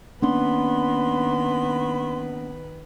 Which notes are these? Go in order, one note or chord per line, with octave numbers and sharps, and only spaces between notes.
D#3 A#3 B3 C#4 D4 B4 C6